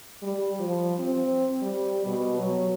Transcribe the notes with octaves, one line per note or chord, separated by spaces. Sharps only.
G3
F3
C4
G3
B2
F#3